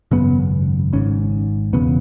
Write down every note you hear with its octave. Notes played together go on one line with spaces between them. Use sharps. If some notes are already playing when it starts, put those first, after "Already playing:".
G#1 F#2 C#3 B3
G#1 G#2 C#4
E1 E2 C#3 B3